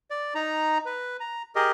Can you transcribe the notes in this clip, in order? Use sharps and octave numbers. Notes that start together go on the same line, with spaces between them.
D5
D#4 A#5
B4
A#5
G4 G#4 A#4 D#5